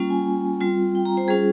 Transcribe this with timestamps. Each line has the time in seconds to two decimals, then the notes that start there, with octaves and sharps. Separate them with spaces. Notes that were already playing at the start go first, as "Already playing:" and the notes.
Already playing: G3 A#3 C#4 F4
0.10 G#5
0.61 G3 C4 F4
0.95 G5
1.05 A#5
1.17 C5
1.28 G3 C#4 F4 G#4